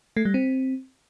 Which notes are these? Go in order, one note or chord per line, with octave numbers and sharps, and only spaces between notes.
A3
G3
C4